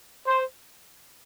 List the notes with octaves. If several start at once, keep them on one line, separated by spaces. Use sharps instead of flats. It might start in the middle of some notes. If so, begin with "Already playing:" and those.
C5